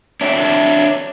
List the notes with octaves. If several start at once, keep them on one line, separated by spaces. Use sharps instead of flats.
D4 C#5 E5